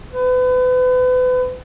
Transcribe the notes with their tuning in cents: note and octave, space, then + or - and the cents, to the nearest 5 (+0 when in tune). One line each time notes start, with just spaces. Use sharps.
B4 +35